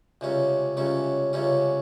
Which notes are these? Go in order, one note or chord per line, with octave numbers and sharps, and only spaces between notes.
C#2 C3 G3 C#4
C#2 C3 G3 C#4
C#2 C3 G3 C#4